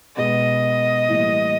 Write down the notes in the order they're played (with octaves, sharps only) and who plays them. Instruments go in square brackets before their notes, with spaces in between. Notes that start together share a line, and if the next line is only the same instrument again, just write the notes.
[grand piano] B2 G#3 B3 [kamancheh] D#5
[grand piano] A2 E3 G3 A#3